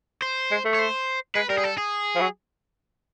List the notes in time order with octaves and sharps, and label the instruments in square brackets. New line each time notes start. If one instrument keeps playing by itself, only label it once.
[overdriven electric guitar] C5
[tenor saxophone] G#3
A3
[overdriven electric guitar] C#5
C5
[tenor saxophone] G#3 [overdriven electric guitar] B4
[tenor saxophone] G3 [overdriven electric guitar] A#4
[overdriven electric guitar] G#4
A4
G#4
[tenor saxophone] F3
F#3